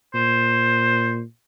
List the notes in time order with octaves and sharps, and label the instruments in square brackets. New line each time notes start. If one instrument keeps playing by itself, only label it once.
[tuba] A#2 [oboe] C5